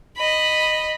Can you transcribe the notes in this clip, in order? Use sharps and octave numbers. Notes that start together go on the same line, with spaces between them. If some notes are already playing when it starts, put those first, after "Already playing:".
D#5 B5